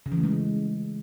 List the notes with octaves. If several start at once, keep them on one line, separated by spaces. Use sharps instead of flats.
C#3
E3
A3
G#3